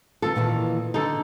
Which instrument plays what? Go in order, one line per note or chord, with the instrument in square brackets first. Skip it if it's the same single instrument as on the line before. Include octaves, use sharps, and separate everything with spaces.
[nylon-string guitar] D#3 E3 F4 [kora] A4
[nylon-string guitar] A#2 D#3 E3
[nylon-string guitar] D3 [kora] D#4 A4